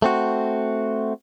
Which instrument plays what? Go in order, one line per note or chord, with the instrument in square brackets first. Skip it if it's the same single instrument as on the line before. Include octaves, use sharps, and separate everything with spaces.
[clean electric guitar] A3 C4 F#4